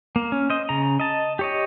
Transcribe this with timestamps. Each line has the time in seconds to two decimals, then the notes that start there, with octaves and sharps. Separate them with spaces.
0.16 A#3
0.32 C#4
0.50 C5 D#5
0.69 C#3 A#5
1.00 D#5 A5
1.39 G4 C#5 D#5